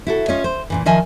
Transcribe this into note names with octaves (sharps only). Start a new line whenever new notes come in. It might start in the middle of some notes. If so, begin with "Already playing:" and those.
E4 F#4 A4
C#4 F4 C#5 D#5
C5
A#2 C#3 E3
D#3 F3 D#5 E5 G#5